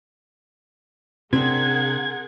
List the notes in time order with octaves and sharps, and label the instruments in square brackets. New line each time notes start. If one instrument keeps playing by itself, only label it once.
[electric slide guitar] C3 D4 [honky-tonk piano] C4 [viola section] G#4 A#4 F#5 [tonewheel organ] G#6